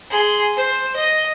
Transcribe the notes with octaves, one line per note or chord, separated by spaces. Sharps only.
G#4 C6
C5
D#5